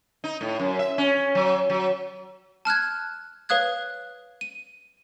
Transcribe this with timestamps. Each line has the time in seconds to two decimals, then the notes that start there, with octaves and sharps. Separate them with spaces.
0.24 D#4
0.41 A2
0.60 F#2
0.79 E5
0.98 C#4
1.35 F#3
1.70 F#3
2.65 A5 F6 F#6 G#6
3.49 B4 C#5 F5 D#6 F#6 G#6
4.41 D#7